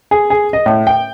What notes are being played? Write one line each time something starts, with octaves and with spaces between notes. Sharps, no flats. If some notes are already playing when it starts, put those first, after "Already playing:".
G#4
G#4
D#5
A2
G5